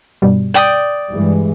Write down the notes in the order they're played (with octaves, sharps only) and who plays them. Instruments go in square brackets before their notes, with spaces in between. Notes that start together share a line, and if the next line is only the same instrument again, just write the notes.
[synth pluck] G2 B2 G3
[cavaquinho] D5 G5 D#6
[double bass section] G2 E3 G#3